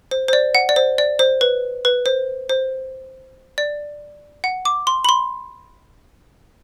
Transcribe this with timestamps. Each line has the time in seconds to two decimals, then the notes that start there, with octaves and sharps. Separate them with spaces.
0.11 C5
0.28 C5
0.33 D5
0.55 F#5
0.69 D5
0.76 C5
0.98 D5
1.19 C5
1.41 B4
1.85 B4
2.06 C5
2.49 C5
3.58 D5
4.44 F#5
4.65 D6
4.87 C6
5.05 B5
5.09 C6